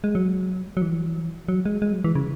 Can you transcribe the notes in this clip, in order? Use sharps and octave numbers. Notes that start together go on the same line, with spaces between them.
G#3
F#3
F#3
E3
F#3
G#3
G#3
F#3
E3
C#3